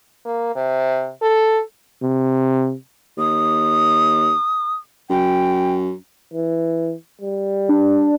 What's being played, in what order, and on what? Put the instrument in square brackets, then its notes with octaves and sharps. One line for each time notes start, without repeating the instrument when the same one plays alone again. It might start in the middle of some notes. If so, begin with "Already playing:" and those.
[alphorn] A#3
C3
A4
[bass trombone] C3
[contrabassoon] D#2 [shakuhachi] D#6
[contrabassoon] F#2 [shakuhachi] G5
[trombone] E3
G3
[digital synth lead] D4